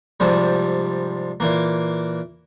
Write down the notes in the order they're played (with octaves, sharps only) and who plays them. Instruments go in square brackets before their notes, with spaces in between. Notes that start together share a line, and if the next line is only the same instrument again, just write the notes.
[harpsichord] G#2 C3 F3 G3
A#2 E3 A#3